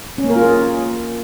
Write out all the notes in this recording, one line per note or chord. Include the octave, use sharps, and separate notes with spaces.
C#4
A#3
A#4
F4
G#4